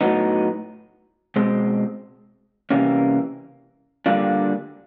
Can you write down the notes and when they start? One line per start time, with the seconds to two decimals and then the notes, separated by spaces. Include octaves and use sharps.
0.01 A2 F#3 B3 D#4
1.36 B2 G#3 C4
2.70 C3 E3 G3 A#3 C#4
4.06 D3 G3 A#3 D4 F4